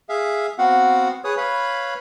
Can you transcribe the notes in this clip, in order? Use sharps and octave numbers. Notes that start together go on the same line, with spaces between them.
G#4 E5 F5
B3 C4 F#4 F5 F#5
G#4 B4 C#5 D#6
B4 C#5 F5 B5